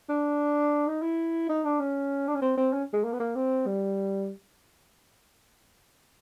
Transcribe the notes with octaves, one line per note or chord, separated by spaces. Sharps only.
D4
D#4
E4
D#4
D4
C#4
D4
C#4
C4
C4
C#4
G#3
A#3
B3
A#3
C4
G3